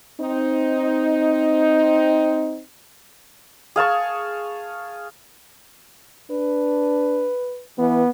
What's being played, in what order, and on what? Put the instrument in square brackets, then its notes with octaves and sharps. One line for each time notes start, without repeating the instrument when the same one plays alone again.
[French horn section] C4 D#4
[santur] G#4 F5 A5 C#6
[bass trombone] D4 [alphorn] B4
[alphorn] E3 [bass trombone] B3